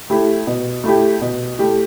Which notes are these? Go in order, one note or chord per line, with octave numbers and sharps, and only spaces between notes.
A3 E4 G4
B2
A3 E4 G4
B2
A3 E4 G4